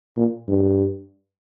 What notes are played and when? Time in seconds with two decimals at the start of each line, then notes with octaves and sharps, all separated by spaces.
0.17 A#2
0.48 G2